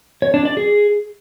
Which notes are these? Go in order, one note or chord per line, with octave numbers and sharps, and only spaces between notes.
C#5
D4
D5
G#4